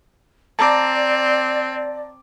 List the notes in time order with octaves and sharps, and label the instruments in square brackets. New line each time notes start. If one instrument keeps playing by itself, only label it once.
[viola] C4 [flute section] D5 [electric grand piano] A5 A#5 D6